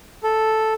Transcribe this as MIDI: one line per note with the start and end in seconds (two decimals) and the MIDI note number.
0.24 0.73 69